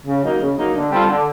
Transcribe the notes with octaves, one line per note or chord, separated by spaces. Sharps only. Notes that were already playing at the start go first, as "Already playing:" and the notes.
C#3
F#3 A#3 D#4
C#3
F#3 A#3 D#4
D3
G3 C4 F4 A4
D3